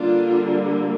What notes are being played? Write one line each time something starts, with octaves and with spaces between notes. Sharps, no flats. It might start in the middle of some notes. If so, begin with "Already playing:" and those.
Already playing: D3 G3 A#3 D4 F4